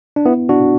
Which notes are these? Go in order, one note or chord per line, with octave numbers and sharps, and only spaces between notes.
D4
B3 E4
D4 F#4